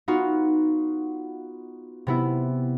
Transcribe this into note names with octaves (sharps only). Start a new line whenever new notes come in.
B3 D#4 F4 F#4
C3 B3 E4